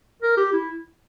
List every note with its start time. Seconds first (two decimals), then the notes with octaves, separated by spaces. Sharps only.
0.22 A#4
0.37 G4
0.53 E4